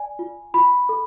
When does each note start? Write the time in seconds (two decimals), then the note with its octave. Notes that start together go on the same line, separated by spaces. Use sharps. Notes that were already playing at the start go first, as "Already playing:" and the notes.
Already playing: D5 G#5
0.19 F4
0.54 F4 B5
0.89 A4